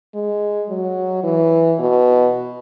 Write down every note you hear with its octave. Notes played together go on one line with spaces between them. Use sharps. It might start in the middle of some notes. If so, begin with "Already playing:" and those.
G#3
F#3
E3
B2